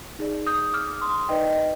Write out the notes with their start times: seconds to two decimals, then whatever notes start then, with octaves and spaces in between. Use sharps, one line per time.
0.19 D#4 G#4 D5
0.47 D#6 G6
0.74 D6 F6
1.01 C6 D#6
1.29 D#4 B4 D5 D#5 G5
1.47 D#5